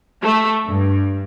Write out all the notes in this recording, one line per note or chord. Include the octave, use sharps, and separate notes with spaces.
A3
G2